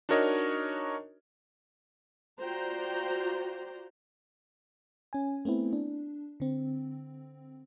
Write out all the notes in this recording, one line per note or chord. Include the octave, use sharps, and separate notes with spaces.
D4 D#4 F#4 A#4 C#5 D#5
F4 F#4 C5 D5 G5 A#5
C#4 G#5
A3 B3 C4 E4
D4
D3 C4